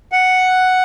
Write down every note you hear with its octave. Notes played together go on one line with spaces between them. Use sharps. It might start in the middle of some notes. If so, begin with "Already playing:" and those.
F#5